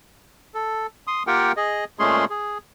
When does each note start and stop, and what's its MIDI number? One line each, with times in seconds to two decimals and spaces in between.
0.54 0.87 69
1.07 1.23 84
1.07 1.23 87
1.27 1.52 58
1.27 1.52 65
1.27 1.52 67
1.27 1.52 70
1.27 1.52 78
1.27 1.52 79
1.57 1.84 68
1.57 1.84 75
1.99 2.25 46
1.99 2.25 56
1.99 2.25 57
1.99 2.25 61
1.99 2.25 68
1.99 2.25 84
2.30 2.58 68